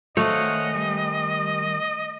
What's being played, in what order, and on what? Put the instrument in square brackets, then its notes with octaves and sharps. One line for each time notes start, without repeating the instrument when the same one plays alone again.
[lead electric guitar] D#3 C5 [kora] A3 [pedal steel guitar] C#5 F5 F#5 [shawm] D#5
[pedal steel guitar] G3